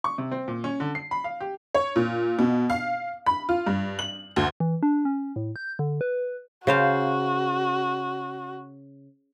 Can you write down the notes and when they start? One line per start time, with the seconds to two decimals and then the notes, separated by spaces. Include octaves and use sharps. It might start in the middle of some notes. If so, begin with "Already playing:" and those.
0.04 C#6
0.18 C3
0.31 C4
0.48 A#2
0.64 C#4
0.80 D3
0.95 C7
1.11 B5
1.24 F5
1.41 G4
1.74 C#5
1.96 A#2
2.39 B2
2.70 F5
3.26 B5
3.49 F4
3.67 G2
3.99 F#7
4.36 D2
4.60 E3
4.83 D4
5.05 C#4
5.36 A2
5.56 G6
5.79 D3
6.01 B4
6.67 C#3 F#4 C5 F5